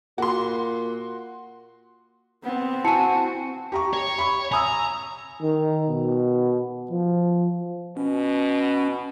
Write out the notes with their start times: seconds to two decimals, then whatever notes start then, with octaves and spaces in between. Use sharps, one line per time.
0.18 A#2 F#4 C6
2.44 B3 C4
2.85 E4 F#4 G#5 A5 C#7
3.72 G4 A#5 C#6
3.93 C#5
4.18 B5 C#6
4.52 G#5 A#5 D#6 E6
5.42 D#3
5.89 B2
6.91 F3
7.97 B2 C#4